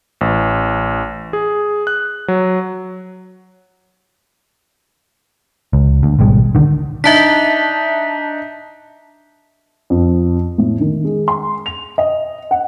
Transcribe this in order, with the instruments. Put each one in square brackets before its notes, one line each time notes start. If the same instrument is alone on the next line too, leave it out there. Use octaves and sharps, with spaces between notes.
[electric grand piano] A1
G#4
F#6
F#3
[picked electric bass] C#2
D2
G#1 B2 G3 G#3
C2 D3 D#3
[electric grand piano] D4 D#4 [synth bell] E5 A5 B6
[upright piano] F2
A2
D#3
G#3
C6
F7
D#5
F#5